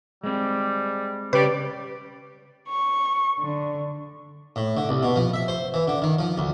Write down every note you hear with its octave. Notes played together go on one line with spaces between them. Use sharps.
G3 G#3 C4
C#3 G3 G4 B4 C#5 D5
C#6
D3
A2
D3
C2
B2
F3
E5
C5
E3
D3
D#3
F3
D2